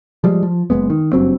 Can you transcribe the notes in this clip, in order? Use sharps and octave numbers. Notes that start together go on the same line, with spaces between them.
F3 G3 G#3
F3
F#1 G#2 G#3 B3
D#3
F#1 G2 F#3 C4